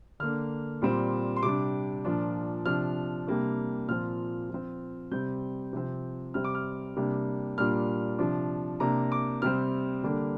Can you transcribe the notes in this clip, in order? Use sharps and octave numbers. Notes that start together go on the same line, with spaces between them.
D3 A#3 D4 F6
A#2 G3 C4
C6
C3 G3 D4 D6
A#2 F3 D4
C3 F3 D4 F6
C3 G3 A#3 D4
A#2 F3 C4 F6
F3 C4
C3 G3 C4 G6
C3 F3 C4
C3 G3 C4 F6
D6
F6
C3 G3 A#3 D4
A#2 G3 A#3 D4 F6
C3 F3 D4
C3 A#3 D4 A#5
D6
C3 G3 C4 F6
D3 G3 A#3 D4